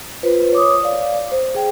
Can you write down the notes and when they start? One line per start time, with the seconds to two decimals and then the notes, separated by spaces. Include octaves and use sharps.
0.23 F4 B4 C5
0.52 C#5 D6 D#6
0.83 D5 F5
1.32 C5
1.55 G#4 G5